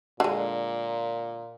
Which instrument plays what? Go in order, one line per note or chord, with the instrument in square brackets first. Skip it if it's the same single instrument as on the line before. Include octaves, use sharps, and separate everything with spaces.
[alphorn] A#2 [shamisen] D3 G#3